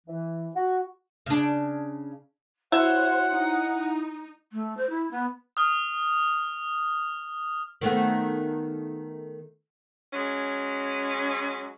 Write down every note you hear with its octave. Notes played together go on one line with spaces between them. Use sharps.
E3
F#4
C#3 D4
E4 F#4 C5 C#5 E5 F#5
D#4
A3
C5
E4
B3
D#6 F6
D#3 A3 B3
F#3 G#3 C#4